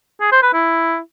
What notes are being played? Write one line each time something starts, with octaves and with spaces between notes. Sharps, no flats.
G#4
C5
B4
E4